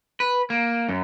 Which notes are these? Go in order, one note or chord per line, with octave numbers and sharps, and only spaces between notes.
B4
A#3
F#2